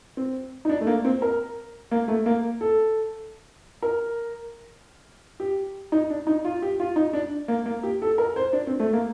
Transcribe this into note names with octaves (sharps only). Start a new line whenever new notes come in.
C4
D#4
D4
A3
A#3
C4
A#4
A#3
A3
A#3
A4
A#4
G4
D#4
D4
D#4
F4
G4
F4
D#4
D4
A#3
A#3
G4
A4
A#4
C5
D4
C4
A3
A#3